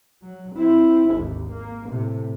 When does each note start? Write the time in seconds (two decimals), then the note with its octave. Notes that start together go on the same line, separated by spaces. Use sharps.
0.22 F#3
0.55 C4 E4
1.11 G#1 D#2
1.51 A#3
1.87 A2 C3